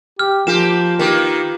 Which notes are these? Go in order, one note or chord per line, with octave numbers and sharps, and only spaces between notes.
G4 F6
F3 A#3 F4 G4 E7
D#3 A#3 G4 B4